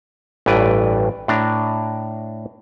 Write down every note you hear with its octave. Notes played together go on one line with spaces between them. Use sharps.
A1 G2 E3 B4 D5
A2 D4 A#5